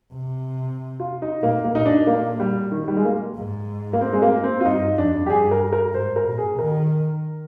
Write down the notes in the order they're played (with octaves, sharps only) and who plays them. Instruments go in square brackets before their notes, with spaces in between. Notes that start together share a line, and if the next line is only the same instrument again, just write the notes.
[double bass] C3
[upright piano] F4
D#4
[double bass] A#2 [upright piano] A#3
[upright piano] A#3
[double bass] A#2 [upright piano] D#4
[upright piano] D4
A#3
G3
D#3
G3
G#3
A#3
[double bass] G#2
[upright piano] A#3
C4
G#3
A#3
C4
F4
[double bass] G2 [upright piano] D#4
[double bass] F2 [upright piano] D4
[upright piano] G4
[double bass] G2 [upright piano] G#4
[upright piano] A#4
A#4
[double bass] G#2 [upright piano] C5
[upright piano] A#4
[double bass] A#2
[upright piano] G#4
[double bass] D#3 [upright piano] A#4